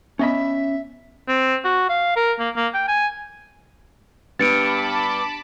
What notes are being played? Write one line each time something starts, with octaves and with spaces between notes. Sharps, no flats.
B3 C#4 D#5 E5 B5
C4
F#4
F5
A#4
A#3
A#3
G5
G#5
G2 B3 A5 B5 D6 A6 C#7 D7